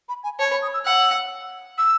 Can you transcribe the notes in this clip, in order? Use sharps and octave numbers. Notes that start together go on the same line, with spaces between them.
B5
G#5
C#5 A5
B5
D#6
E6
F#5 E6
E6